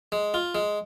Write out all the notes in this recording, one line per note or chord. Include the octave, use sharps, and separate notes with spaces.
G#3
F4
G#3